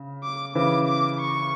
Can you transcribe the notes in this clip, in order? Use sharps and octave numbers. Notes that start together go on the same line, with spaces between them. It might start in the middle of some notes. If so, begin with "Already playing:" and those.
Already playing: C#3
D6
C#3 E3 D6
D6
C#6